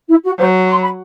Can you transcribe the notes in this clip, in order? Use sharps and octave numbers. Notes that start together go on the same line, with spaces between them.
E4
F#4
F#3 C5
C6
B5